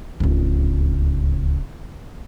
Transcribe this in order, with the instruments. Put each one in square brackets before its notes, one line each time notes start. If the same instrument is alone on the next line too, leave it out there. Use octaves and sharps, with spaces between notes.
[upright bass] D1 C#2